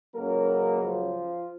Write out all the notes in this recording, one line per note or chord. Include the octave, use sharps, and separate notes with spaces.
C#2 C#3 F#3 A#3 A#4
F3 F4